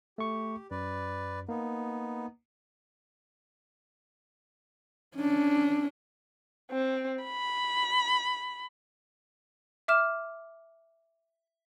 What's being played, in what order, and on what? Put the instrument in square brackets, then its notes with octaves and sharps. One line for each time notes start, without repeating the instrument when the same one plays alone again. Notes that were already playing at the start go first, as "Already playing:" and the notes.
[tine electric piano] A3 C#6 [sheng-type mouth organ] G4
[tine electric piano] F#2 [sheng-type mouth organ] B4 D5
[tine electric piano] A#3 [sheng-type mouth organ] B3 D#4
[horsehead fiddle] C#4 D4
[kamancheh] C4
B5
[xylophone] E5 D6 F6 E7